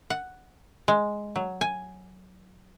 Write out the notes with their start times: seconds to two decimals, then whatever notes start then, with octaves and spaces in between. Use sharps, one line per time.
0.10 F#5
0.88 G#3
1.36 F#3
1.61 G#5